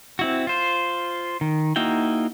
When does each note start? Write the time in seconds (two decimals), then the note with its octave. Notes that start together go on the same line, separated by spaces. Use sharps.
0.19 C4 E4 F#4
0.47 F4 C5
1.41 D#3
1.76 A#3 D#4 E4 F#4 G5